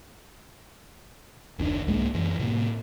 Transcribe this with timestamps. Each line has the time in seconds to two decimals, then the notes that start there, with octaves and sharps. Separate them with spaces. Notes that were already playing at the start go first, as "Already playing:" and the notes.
1.58 F#1 D#2 C#4 D4
1.87 C2 G#2 G#3 A#3
2.14 F#2 E3
2.39 A2 C3 A#3